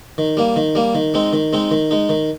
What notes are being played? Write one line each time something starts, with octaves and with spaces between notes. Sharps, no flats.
D#3
G3 A#3
D#3
G3 A#3
D#3
G#3 C4 D#4
D#3
G#3 C4 D#4
D#3
G#3 D#4
D#3